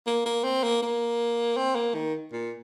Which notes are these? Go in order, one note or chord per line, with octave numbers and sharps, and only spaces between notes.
A#3
A#3
C4
A#3
A#3
C4
A#3
D#3
A#2